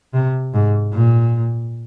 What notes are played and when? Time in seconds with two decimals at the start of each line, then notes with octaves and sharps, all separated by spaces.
0.14 C3
0.54 G#2
0.93 A#2